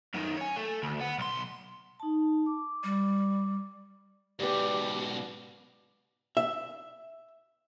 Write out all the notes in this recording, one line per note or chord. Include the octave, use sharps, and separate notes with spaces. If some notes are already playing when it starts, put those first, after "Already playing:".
F#2 D#3
C#5 G#5
A3
D2
B3
B1 C6
D#4 A5
D6
G3
G#2 B2 G4 B4 D5
E5